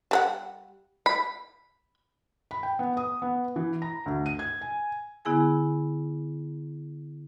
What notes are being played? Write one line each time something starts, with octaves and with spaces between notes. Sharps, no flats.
G3 A4 F#5
B5
B5
G5
B3
D#6
B3
E3
A#5
D2
D#7
G#6
G#5
D3 B3 E4 G#4 G#5